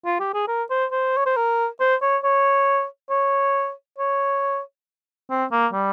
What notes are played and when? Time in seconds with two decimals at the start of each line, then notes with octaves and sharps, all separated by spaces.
0.06 F4
0.20 G4
0.34 G#4
0.48 A#4
0.70 C5
0.92 C5
1.17 C#5
1.26 C5
1.36 A#4
1.80 C5
2.02 C#5
2.24 C#5
3.10 C#5
3.99 C#5
5.30 C4
5.52 A#3
5.73 G3